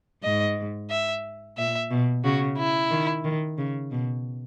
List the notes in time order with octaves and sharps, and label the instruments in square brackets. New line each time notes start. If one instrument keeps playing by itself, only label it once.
[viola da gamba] G#2 [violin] D#5
[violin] E5
[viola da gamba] A#2 [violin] E5
[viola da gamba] B2
[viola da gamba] C#3 [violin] F#4
[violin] E4
[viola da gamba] D#3
D#3
C#3
B2